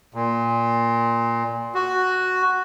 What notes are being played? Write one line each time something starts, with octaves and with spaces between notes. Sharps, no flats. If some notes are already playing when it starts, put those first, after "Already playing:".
A#2
F#4